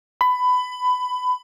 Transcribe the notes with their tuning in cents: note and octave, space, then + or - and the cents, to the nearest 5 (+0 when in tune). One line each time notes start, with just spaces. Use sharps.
B5 +20